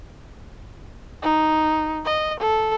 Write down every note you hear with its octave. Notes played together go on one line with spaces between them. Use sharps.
D#4
D#5
A4